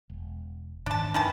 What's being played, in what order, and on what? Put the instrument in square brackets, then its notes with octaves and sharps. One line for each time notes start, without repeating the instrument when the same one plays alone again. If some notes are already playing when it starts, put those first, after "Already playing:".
[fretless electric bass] E1
[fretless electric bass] A1 G#2 D#3 [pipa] D4 A5
[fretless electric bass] F2 D4 [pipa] D#3 E3 A5